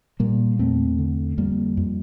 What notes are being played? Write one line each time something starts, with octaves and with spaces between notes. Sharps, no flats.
A#2 G3 A#3
E2 A3 C4
D3
F2 G3 A#3
F2